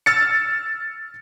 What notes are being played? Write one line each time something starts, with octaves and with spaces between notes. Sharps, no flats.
E6 F6 A6 C#7